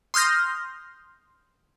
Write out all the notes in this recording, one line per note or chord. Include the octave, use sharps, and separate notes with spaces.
C6 D#6 F6 G6 A#6